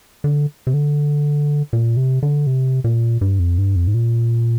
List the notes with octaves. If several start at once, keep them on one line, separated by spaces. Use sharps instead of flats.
D3
C3
D3
A#2
C3
D3
C3
A#2
G2
F2
G2
F2
G#2
A#2